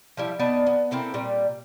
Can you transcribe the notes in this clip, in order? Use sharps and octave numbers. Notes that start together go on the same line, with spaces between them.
F3 G3 E4
B3 D#4 D5 A5
B3
A#3 C4 E4 A4
A#2 G3